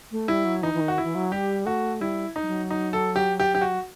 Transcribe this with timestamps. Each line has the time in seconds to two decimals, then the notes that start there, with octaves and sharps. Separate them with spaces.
0.11 A3
0.28 G3 E4
0.45 F#3
0.63 E3 D#4
0.74 E3
0.80 D#3
0.88 F#4
0.98 E4
1.03 E3
1.15 F#3
1.32 G3 G4
1.66 A3 F#4
2.01 G3 E4
2.36 D#4
2.43 G3
2.47 F#3
2.70 D#4
2.93 A4
3.16 G4
3.40 G4
3.55 G4
3.61 F#4